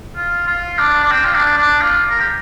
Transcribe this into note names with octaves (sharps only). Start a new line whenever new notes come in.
F4
F4
D4
D4
C4
F4
D4
D4
F4
A#4
G4